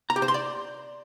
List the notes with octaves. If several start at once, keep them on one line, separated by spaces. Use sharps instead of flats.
A#5
G4
C5
C6
D5